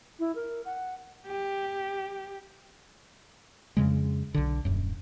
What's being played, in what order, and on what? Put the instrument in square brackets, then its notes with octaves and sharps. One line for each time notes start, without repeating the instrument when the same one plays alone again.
[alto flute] E4
A#4
F#5
[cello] G4
[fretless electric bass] F2 C#3 G#3
B1 D3
D#1 F#2